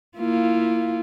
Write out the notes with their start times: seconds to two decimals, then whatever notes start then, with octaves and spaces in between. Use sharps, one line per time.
0.18 A#3 E4 F4